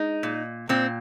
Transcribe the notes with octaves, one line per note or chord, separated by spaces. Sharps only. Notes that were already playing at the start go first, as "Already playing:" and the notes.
Already playing: G#3 D#4
A#2
A#2 C4